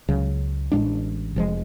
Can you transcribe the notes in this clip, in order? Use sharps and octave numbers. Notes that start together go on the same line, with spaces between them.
C#2 C#3 F#3
A1 A2 G#3 D4
F1 F2 F3 G#3